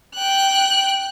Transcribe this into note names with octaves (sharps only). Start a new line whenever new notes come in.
G5 F#6